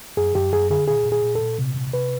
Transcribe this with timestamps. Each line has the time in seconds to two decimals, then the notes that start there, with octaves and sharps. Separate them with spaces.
0.17 F#2 G#4
0.35 F#2 G4
0.53 F#2 G#4
0.70 D3 G#4
0.88 A#2 G#4
1.05 A#2
1.12 G#4
1.23 A#2
1.35 A4
1.41 A#2
1.59 C3
1.76 C3
1.93 C3 B4